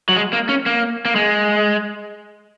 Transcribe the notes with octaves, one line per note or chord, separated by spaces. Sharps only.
F#3
G#3
A#3
C#4
A#3
A#3
G#3